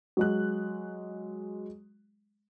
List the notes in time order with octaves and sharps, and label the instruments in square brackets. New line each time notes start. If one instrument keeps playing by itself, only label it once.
[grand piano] F#3 G#3 F#6